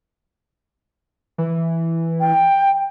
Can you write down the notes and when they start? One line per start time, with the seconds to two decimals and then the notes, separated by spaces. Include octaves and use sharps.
1.38 E3
2.20 G5